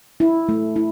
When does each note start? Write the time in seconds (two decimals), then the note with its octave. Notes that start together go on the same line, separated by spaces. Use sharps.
0.20 E4
0.49 A3
0.76 E4